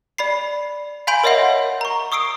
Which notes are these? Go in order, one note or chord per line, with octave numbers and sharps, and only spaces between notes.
D5 B5 C7
F5 G#5 B5 C6 G6 D7
A#4 C#5 D#5 E5 F#5 C6
A#5 C#6
C#6 D#6 E6 C7 D7